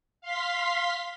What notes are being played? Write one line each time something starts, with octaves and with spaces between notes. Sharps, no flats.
F5 C6 B6